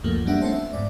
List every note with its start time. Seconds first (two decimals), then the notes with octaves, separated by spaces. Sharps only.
0.03 C#2 F#2 F3 A3 A#3
0.25 F#3 G3 A#3 D4 E5 F#5
0.41 A3 C4 C#4 A4 C5 F#5
0.52 E5
0.73 F2 G#2 D5